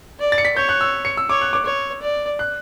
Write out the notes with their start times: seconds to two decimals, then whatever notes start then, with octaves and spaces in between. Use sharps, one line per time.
0.20 D5
0.32 A6
0.38 C#7
0.45 B6
0.56 C#5 G6
0.69 F#6
0.81 E6
1.05 C#7
1.17 E6
1.29 C#5 D6
1.41 F#6
1.53 D6
1.66 C#5
2.02 D5
2.39 F#6